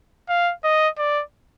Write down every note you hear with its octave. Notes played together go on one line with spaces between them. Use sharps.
F5
D#5
D5